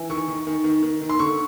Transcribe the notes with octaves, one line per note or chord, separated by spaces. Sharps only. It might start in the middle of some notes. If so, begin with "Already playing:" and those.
Already playing: E3
D#3 C#6
D#3
D#3
D#3
D#3
D#3
C6
D3 C#6